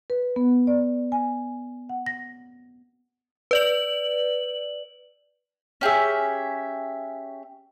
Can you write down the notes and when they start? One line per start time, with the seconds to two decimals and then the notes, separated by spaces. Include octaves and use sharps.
0.10 B4
0.36 B3
0.67 D5
1.12 G#5
1.89 F#5
2.06 A#6
3.51 B4 D5 F#7
5.81 C#4 G4 G#4 E5